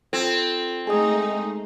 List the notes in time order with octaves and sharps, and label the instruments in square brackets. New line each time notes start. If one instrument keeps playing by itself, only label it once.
[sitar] C4 [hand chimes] F4 A4 G#6
[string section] G#3 A3 D#4 [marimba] G#4 [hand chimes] G#5 D#6